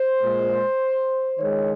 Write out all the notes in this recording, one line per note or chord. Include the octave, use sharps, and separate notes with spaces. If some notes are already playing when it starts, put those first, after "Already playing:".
Already playing: C5
A#2 G#3
D#3 G#3 C#5